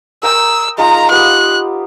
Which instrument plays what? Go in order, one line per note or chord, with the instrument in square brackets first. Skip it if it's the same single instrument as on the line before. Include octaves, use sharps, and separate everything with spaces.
[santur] A#4 G5 D#6 [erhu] E6
[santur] G#3 D#4 F4 [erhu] A#5
[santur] B3 F4 G4 [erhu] F#6